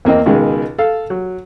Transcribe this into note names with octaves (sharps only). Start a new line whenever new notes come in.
E2 A#3 C4 D#5
C#2 B2 D#3 G#3
A4 F5
F#3